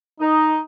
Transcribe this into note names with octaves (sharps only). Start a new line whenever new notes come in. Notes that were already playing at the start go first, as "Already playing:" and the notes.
D#4